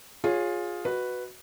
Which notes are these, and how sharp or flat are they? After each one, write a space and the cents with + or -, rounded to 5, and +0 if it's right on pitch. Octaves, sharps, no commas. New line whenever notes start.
F4 +15 G#4 -5 C#5 +0
F#4 +0 B4 +0 D#5 +0